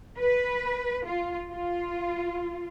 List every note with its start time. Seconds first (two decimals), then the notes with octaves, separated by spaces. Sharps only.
0.18 B4
1.06 F4
1.50 F4